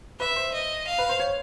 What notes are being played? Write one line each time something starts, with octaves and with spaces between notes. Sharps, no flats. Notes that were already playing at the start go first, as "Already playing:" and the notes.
B4 E5
C5
D#5
F5
B4
C5
C#5